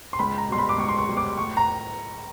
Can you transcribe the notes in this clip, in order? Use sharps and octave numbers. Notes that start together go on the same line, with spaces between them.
C6
C#2 B5
A#5
B2 G3 C6
B5
D6
C#2 C#6
C6
C#6
B2 G3
D6
A2 C#6
A#5